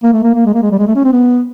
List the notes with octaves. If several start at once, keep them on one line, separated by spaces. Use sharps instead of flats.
A#3
A3
A#3
A#3
G#3
A#3
G#3
G3
G#3
A3
C#4
C4
B3